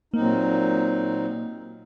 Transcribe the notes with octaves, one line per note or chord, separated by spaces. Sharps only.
A#2 F#3 A#3 C4 D#4